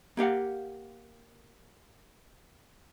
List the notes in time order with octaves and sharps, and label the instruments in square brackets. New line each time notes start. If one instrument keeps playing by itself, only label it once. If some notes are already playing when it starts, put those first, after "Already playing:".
[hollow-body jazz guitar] A#3 G4 F5 F#5